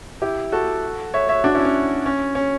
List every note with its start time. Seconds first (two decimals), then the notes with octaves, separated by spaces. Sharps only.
0.22 E4 G4
0.52 F#4 A4
1.14 C#5 E5
1.29 C#5 E5
1.44 D4 F#4
1.55 C#4 E4
1.65 C#4
2.06 C#4
2.35 C#4